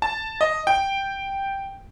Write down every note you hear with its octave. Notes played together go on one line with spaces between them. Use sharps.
A5
D#5
G5